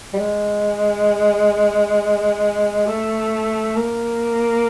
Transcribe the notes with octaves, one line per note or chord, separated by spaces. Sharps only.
G3
G#3
A3
A#3